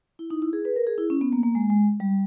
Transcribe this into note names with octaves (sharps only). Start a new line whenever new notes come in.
E4
D#4
E4
G#4
B4
A#4
G#4
E4
C#4
B3
A#3
A#3
G#3
G#3
G3